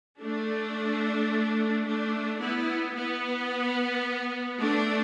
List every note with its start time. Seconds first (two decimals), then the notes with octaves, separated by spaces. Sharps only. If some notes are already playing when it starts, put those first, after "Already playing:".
0.21 A3 D4
1.86 A3 D4
2.41 B3 E4
2.95 B3
4.60 A3 D4